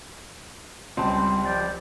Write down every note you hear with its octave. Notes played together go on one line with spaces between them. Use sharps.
C#2 G3 C4 A5
F3 G4 D5